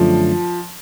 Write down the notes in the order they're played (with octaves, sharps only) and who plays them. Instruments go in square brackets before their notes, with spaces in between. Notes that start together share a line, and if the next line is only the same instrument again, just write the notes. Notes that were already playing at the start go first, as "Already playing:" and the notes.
Already playing: [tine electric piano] F#2 D3 F#3 A3 D4 [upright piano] F3